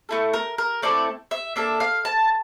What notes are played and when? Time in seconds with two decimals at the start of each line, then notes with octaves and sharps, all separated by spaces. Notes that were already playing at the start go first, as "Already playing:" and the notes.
0.09 A3 E4 A4
0.33 A#4
0.58 A#4
0.82 A3 C4 E4 A4 D5
1.31 E5
1.56 A#3 D4 A4 E5
1.80 F5
2.05 A5